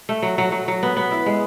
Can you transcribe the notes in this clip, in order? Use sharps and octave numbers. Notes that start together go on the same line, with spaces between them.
A3
F#3
F#3
F#3
F#3
B3
B3
E4
G#3